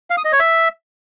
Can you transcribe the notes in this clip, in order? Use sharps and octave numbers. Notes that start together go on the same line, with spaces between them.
F5
D#6
D#5
C#5
E5